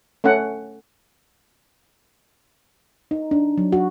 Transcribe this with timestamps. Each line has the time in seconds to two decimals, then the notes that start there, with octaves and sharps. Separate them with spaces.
0.24 A3 C#4 F#5
3.11 D#4
3.31 D4
3.58 F#3
3.72 F#4